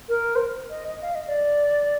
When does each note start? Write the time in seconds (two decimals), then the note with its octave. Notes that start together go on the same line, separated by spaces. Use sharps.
0.09 A#4
0.36 C5
0.70 D#5
0.88 D#5
1.02 F5
1.15 D#5
1.27 D5